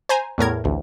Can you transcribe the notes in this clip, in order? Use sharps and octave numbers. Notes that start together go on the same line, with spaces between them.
C5 G#5 A#5
E2 A2 A#4 G#6
A1 D2